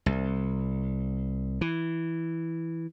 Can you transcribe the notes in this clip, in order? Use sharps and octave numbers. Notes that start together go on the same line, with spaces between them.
C2
E3